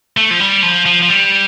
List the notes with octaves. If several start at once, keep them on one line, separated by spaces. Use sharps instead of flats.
A3
F3
G3
F3
F3
F3
G3